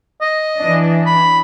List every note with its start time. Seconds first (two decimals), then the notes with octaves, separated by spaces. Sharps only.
0.21 D#5
0.58 E3 D4
1.06 B5